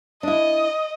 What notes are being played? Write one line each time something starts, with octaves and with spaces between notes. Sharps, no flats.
D4 E4 D#5